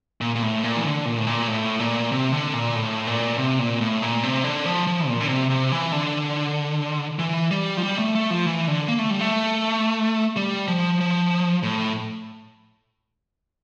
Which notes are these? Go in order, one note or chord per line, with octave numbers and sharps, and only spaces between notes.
A#2
A#2
A2
A#2
E3
D3
A#2
A2
A#2
A2
A#2
C3
D3
A#2
A2
A#2
C3
A#2
A2
A#2
C3
D3
F3
F3
A#2
D3
C3
C3
E3
D3
E3
G3
F3
G3
A3
A3
F3
E3
D3
A#3
A3
G3
A3
G3
F3
F3
A2